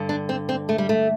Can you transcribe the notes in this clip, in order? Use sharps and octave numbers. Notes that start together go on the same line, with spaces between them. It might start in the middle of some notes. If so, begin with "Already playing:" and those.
Already playing: G2 D3
D4
C4
C4
A3
G3
A3